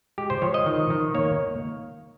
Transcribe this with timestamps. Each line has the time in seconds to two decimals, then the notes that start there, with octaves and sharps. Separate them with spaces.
0.18 G#3 G4
0.30 C5
0.42 F3 C#5
0.54 D#5
0.66 D#3
0.90 D#3
1.14 A#3 C#5